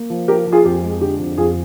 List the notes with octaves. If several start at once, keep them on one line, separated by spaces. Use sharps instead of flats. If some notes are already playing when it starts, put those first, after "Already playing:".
Already playing: A#3
F3
F3 G4 A#4
F3
F4 G#4
F2 G4
G#3
D3 G4
F2
F2 F4 G#4